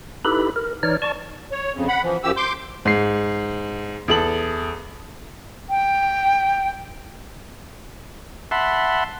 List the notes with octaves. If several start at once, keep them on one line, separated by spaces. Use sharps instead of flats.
D#4 E4 G4 A4 B4 B5
A#4
E3 D#4 C#5 D5 F6
D5 A5 C#6
C#5
F2 C#3
F#5 B5
E3 F3
F#2 F3 G4 E6
C6 D6 G6
G#2 C7
E2 A4 F#7
G5
E5 F#5 A5 B5 C6